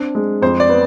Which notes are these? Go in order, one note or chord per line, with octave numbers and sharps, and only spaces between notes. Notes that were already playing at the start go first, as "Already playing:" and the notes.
Already playing: C4 D4
G#3
F2 C5
D5
B3